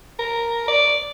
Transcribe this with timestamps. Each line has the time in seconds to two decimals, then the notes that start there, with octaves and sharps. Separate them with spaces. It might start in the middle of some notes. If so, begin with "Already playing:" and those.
0.19 A#4
0.68 D5